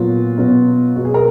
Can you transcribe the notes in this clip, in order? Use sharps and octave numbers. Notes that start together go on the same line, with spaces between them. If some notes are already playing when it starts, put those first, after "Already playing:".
Already playing: A#2 F#3 B3 F4
B2 F#3 B3
B2 G#3 B3 F#4
G#4
A#4